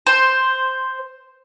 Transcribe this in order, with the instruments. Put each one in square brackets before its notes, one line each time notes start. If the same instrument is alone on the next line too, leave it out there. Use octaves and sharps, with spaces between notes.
[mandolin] C5